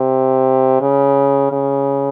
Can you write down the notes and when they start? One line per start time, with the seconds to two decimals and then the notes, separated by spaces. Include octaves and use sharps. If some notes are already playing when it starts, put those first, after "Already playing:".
Already playing: C3
0.81 C#3
1.52 C#3